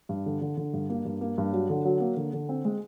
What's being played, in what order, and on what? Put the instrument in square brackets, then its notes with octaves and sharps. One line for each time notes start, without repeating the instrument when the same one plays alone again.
[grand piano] G2
D3
D3
D3
G2
A#3
G2
A#3
G2
F#3
D3
F#3
A#3
D3
D3
C4
G#3